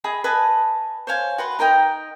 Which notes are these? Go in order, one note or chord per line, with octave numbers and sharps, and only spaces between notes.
G#4 D#5 B5
B4 D#5 G#5 A5
C5 C#5 F5 G#5
F#4 B4 F#5 C6
D#4 A#4 D#5 G5